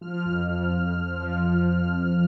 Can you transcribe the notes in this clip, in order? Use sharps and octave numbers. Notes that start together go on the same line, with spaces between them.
F3 F6
F2
F2
F2
F3
F3
F3